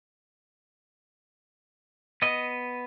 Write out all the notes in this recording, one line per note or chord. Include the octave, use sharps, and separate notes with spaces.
B3 D#5